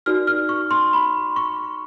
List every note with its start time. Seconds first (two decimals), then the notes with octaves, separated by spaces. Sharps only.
0.06 D#4 F#4 A#4 D5 F6
0.27 F6
0.49 C#6
0.71 C6
0.93 B5
1.36 C#6